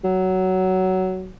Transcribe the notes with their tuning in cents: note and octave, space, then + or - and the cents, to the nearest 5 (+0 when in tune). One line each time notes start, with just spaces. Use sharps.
F#3 +15